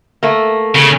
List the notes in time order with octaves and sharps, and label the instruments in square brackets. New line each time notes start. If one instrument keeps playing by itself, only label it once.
[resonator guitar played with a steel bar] A3 A#3
[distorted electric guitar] C#3